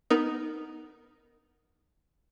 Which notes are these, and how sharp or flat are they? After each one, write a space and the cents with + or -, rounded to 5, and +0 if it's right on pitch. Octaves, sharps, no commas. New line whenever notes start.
B3 +0 D#4 +0 A#4 +0